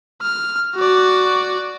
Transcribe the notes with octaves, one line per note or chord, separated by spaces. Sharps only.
F6
F#4 D5